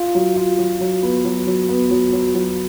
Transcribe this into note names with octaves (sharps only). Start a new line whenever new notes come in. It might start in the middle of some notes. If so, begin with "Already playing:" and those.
Already playing: F4
F#3
F4
F#3
F#3
B3
F#3
F#3
B3
F#3
F#3
F#3